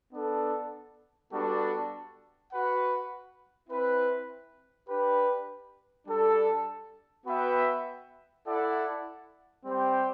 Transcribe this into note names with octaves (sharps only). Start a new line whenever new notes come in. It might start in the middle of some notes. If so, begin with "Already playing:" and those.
B3 D4 A4
G3 B3 D4 F#4 A4
F#4 B4 F#5
C4 E4 B4
D4 G4 B4
G3 D4 A4
B3 F#4 B4 E5 G5
E4 A4 D5 F#5
G3 C4 G4 C5 G5